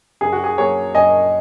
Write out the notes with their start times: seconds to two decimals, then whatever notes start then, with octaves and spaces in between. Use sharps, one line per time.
0.21 F#2 G#4
0.32 F#4
0.44 G#4
0.58 F#3 A#3 G#4 C#5
0.94 F#2 D#5 G#5